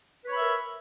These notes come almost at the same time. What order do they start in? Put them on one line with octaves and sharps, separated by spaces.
B4 C#5 B5 E5 A#4